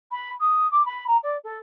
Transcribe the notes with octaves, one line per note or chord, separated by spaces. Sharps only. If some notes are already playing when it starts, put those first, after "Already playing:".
B5
D#6
D6
B5
A#5
D5
A4